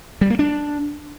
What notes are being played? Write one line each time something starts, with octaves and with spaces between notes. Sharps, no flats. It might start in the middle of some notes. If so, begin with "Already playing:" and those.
G3
A#3
D4